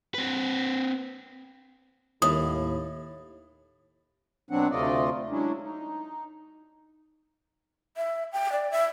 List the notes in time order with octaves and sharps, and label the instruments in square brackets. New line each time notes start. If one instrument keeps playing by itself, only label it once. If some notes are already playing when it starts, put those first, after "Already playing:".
[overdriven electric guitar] C4 B4
[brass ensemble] D#2 [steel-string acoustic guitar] A2 [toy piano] D#6
[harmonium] B2 F#3 C4 D4 F#5
D2 C3 A3 F4 D5 D#5
F#3 G#3 C#4 D4 E4
D#4
[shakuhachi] E5
G5
D5
E5